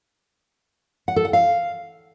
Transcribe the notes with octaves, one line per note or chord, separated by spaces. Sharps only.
F#5
A4
F#5
F5